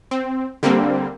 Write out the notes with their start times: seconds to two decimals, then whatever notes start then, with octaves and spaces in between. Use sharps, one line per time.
0.11 C4
0.63 D3 G3 A#3 C4